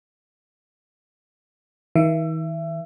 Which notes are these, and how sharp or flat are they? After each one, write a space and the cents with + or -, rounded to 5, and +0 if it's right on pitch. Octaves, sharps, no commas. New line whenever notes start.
D#3 +45 E5 +25